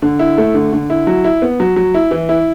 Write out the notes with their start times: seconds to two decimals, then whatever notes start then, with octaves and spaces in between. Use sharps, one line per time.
0.02 D3
0.19 E4
0.38 A3
0.54 D3
0.73 D3
0.90 E4
1.07 F#3
1.24 E4
1.42 B3
1.60 F#3
1.76 F#3
1.94 E4
2.11 E3
2.29 E4